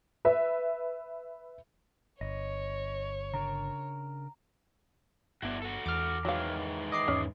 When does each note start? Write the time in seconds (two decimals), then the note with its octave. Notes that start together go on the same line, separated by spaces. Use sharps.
0.25 B4 E5
2.21 G1 C#5 D#5
3.34 C#3 D4 A#4 A#5
5.42 G1 B3 D4 E4 F#4
5.62 F#4 A4
5.86 E2 D6 F6
6.25 D#3 E3 F#3 G#3 F5
6.92 D#5 D6 C7
7.08 E2 G#2 C#4